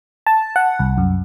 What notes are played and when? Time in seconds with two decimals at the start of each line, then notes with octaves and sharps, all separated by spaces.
0.26 A5
0.56 F#5
0.79 C2
0.98 F#2